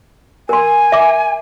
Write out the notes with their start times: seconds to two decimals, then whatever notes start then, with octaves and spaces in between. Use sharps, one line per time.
0.49 A#4 G#5 C6
0.92 E5 D6